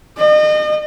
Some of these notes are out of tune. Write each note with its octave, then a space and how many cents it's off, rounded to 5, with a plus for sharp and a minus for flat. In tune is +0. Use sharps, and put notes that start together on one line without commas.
D#5 -35